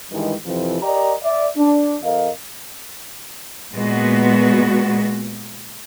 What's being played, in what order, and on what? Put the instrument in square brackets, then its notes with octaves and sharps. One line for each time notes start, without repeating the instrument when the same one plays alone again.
[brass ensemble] G2 D#3 E3 G#3
F2 C3 E3 F3
G4 A#4 D5 D#5 A#5
D5 E5
D4
F2 A#4 D#5 F5
[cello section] A#2 G#3 B3 F#4